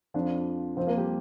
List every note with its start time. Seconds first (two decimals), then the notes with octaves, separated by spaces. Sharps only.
0.14 F2 F3 D4 D5
0.77 F2 F3 C4 C5
0.87 A#3 A#4
0.97 G3 G4